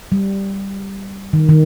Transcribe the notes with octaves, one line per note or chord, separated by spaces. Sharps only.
G3
D#3
D#3